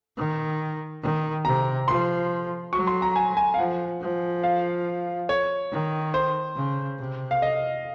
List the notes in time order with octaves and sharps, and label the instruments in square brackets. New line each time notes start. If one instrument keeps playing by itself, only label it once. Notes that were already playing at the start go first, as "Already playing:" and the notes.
[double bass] D#3
D#3
[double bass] C3 [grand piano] A#5
[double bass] F3 [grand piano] C6
[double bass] F#3 [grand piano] C#6
[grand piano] C6
A#5
G#5
G#5
F5
[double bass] F3 [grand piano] F#5
[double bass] F3
[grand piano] F5
C#5
[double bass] D#3
[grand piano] C5
[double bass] C#3
C3
[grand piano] F5
D#5